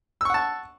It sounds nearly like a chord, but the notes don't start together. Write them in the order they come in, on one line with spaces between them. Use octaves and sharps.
E6 C#6 F#5 A5